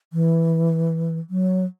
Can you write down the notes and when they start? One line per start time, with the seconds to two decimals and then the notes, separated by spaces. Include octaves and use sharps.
0.13 E3
1.30 F#3